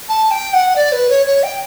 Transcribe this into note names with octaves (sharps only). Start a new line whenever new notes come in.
A5
G5
F#5
D5
B4
C#5
C#5
G5